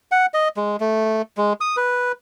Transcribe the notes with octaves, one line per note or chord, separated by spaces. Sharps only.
F#5
D#5
G#3
A3
G#3
D#6
B4